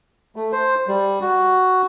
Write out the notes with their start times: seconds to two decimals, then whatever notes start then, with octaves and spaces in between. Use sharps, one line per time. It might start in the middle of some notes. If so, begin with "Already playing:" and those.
0.36 A3
0.52 C5
0.88 G3
1.21 F#4